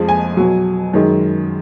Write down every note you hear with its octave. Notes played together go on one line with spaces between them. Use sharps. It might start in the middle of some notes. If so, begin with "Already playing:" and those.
Already playing: F2 F3 G#3
G#5
B2 F#3
F#2 D#3 G#3